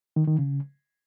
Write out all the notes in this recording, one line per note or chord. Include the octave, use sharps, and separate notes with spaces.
D#3
D#3
C#3